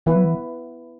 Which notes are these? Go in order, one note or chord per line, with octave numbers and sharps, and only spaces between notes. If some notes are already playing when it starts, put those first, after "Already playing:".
E3 B3 E4 B4
F#3
E3